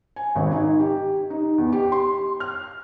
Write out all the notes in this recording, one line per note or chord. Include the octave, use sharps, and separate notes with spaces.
G#5
G#1
D#4
G4
D#4
E2
G4
C6
F6